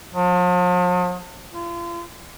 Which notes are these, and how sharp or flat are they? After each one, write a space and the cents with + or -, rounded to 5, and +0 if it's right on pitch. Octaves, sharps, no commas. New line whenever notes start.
F3 +45
F4 -35